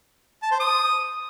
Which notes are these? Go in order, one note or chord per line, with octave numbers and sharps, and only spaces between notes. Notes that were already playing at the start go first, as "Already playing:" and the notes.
A5
C5
D#6